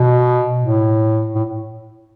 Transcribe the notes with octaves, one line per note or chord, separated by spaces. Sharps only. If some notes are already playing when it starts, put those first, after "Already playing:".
Already playing: B2
A2
A2